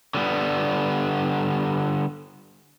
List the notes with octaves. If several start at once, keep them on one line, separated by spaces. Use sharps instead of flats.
D3 G3 B3